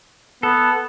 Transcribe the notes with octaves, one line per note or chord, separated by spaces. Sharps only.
B3 A4